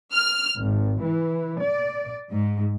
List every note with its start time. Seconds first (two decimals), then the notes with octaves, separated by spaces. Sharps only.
0.12 F6
0.61 G#1
1.04 E3
1.62 D5
2.32 G#2